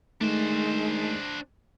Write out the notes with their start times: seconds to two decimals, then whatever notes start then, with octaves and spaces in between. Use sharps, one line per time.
0.21 D#3 G#3 A3 D4 C5